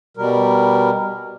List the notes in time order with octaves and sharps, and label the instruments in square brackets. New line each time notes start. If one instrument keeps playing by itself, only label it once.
[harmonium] B2 G3 A#4